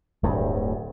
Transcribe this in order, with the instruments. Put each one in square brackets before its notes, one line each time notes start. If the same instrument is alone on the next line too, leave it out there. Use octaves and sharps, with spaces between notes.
[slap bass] D1 D2 G2